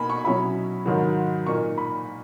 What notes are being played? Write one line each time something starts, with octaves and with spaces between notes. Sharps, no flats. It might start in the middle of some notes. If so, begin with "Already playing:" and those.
Already playing: B2 A#3 D#4 G#5 B5
C#6
B2 F#3 C#4 E4 B5
G#2 D#3 F#3
A#2 A#3 D#4 C#6
B5